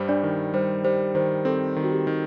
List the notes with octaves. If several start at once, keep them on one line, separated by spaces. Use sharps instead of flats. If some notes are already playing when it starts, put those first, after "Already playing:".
Already playing: G2 G3 C5
D4 D5
D#3
G3 C5
G3 C5
D#3 C5
C4 A4
D#3
F#4
G4
D#3